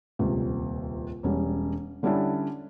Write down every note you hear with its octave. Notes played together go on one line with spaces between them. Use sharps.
D#1 C#2 C3
E1 G3 C#4
D3 G3 C#4 D4 E4